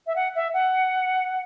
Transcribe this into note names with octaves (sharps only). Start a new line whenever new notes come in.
E5
F#5
E5
F#5